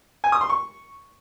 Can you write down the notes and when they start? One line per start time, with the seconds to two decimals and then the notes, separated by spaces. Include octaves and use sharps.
0.24 G#5
0.32 D#6
0.41 C6
0.50 C#6